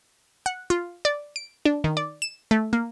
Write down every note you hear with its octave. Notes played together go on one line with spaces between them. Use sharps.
F#5
F4
D5
D7
D4
D#3
D5
E7
A3
A#3